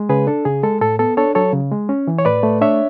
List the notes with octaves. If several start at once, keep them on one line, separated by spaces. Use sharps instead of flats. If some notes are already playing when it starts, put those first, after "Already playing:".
Already playing: G#3
C#3 G#4 B4
D4 A4
C#3 G#4
G#3 A4
A2 A4
B3 A4
D4 A4 C#5
F#3 A4 C#5
C#3
G#3
C#4
E3
C#5
A2 B4 D5
A3
D4 C#5 E5